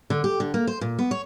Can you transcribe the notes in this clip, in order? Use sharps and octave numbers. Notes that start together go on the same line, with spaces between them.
D3
G4
D3
A#3
C5
A#2
B3
C#5